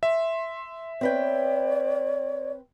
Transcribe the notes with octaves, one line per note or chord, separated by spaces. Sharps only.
E5 C6
C4 B4 C#5 D5 G5